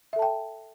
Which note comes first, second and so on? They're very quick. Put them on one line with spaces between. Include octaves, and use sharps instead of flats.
E5 A4 A5 G5